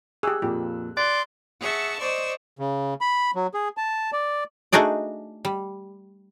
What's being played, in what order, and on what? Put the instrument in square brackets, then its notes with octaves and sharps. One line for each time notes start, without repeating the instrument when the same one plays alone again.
[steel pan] G4 G#4 [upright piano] E6 F#6
[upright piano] F2 A#2 [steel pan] G4
[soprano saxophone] D5 [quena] C6 [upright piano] F#6
[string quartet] G#4 E5 F#5 A5 C#6 E6
C5 D5 D#5 C#6 E6
[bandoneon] C#3
B5
F#3
G#4
A5
D5
[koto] A3 D4 D#4 F#4 G#4 D5
G3